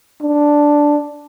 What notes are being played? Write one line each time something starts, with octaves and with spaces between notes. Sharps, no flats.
D4